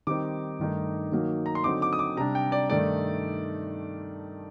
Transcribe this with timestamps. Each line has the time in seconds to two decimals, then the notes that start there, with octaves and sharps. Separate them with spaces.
0.07 D#3 G3 C4 D#4 D6
0.59 G2 D#3 A3 D#4
1.12 D#3 F#3 A#3 D#4
1.46 A#5
1.55 C6
1.64 D3 F#3 C4 D#4 D6
1.82 D6
1.93 D#6
1.99 D6
2.17 C3 G3 D4 A#5
2.35 G5
2.52 D5
2.70 G2 D#3 A3 D#4 D5